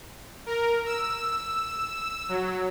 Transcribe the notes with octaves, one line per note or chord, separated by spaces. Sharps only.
A#4
E6
F#3